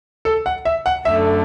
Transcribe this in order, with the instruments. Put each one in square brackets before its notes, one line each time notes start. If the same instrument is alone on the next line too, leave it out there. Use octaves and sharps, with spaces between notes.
[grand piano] A4
F#5
E5
F#5
[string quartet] F#2 D3 A3 [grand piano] E5